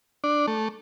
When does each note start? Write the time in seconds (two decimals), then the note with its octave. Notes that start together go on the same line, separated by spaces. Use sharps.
0.24 D4
0.47 A3